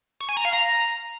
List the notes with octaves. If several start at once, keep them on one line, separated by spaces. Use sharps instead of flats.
C#6
G#5
A#5
F5
A#5